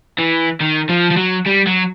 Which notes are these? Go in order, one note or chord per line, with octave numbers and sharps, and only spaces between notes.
E3
D#3
F3
F3
F#3
G3
F#3